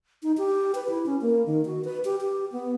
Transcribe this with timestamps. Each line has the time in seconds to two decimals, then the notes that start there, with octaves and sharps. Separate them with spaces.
0.23 D#4
0.38 G4
0.75 B4
0.90 E4
1.06 C#4
1.21 A#3
1.46 D#3
1.66 F#4
1.84 B4
2.05 G4
2.21 G4
2.52 B3